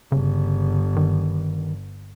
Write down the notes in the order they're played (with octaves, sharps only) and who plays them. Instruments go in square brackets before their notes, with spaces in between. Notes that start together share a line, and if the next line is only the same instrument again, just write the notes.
[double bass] G1 [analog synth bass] C#3
[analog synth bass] D#3